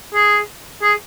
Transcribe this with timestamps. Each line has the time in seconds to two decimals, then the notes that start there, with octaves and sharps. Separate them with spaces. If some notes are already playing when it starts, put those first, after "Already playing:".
0.14 G#4
0.82 G#4